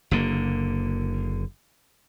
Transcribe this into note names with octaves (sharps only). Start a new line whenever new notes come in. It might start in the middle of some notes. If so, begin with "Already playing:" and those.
F#1 D3 A#3